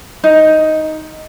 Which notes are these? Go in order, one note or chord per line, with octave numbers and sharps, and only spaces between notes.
D#4